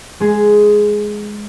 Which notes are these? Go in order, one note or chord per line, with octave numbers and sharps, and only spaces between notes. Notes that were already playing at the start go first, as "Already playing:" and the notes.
G#3 G#4